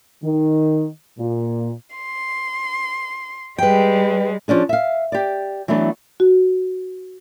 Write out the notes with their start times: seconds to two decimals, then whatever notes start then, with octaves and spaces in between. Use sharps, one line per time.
0.23 D#3
1.19 A#2
1.96 C6
3.58 G3 G#3 B4 G5
4.48 F3 C#4 D4 G#4
4.69 E5 F5
5.12 G4 D5
5.68 E3 F#3 A3 B3 D4
6.20 F#4